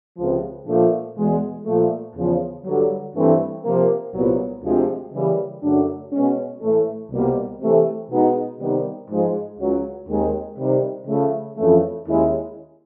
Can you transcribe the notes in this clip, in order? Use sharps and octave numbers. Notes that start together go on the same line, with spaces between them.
C#2 C3 F3
A#2 F3 A3 D4
E2 B2 G#3
A#2 F3 A3
E2 C#3 F3
G2 D3 F#3
G2 E3 A3 C4
C3 F3 A#3
C2 A#2 F#3 B3
D2 C3 F3 G#3
C#3 E3 G3 A#3
F#2 C#3 F#3 A3 D4
B2 G#3 C#4
A2 E3 A3
C2 B2 G3 A#3
C3 E3 A3 C4
B2 G#3 B3 D#4
C3 D#3 G3 B3 D#4
G#2 F3 G#3
C#2 C#3 F#3
D#2 D#3 G#3 C4
C3 D#3 G3
C#3 F3 A3
F2 C#3 E3 A3
D#2 D#3 G#3 C#4 E4